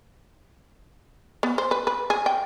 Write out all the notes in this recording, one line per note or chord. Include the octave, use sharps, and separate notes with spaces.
B3
C5
B4
B4
G#4
G5